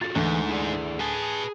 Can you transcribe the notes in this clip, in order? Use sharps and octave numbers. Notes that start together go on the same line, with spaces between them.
F4 F#4 A4 A6
D2 G#2 E3
E4 G#4 D5
G#4 B4 G#5 A5